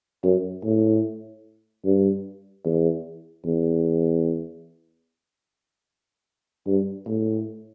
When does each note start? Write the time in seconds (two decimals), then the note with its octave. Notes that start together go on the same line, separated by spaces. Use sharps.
0.23 F#2
0.64 A2
1.85 G2
2.65 E2
3.45 E2
6.67 G2
7.07 A2